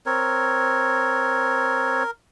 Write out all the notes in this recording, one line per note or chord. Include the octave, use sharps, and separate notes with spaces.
C4 A#4 C#5